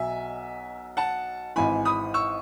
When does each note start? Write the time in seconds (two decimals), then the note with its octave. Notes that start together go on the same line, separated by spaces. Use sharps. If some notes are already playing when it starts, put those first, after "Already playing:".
Already playing: B1 B2 F#3 E5 G#5
0.97 F#5 A5
1.56 G#1 G#2 E3 G#5 B5
1.85 B5 D#6
2.14 C#6 E6